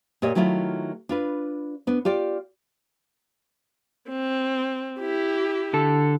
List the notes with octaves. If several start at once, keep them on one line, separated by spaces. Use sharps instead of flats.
A#2 G4 C#5 D#5
D#3 F#3 A3 C#4 E4 F4
D4 F4 B4
B3 D4
F4 G4 D5
C4
E4 G4
D3 A4